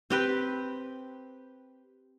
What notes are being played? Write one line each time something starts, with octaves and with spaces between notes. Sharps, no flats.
C4 G4 B4